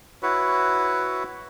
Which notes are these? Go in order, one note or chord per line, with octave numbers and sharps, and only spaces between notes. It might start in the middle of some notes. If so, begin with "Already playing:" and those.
E4 F#4 B4 C#5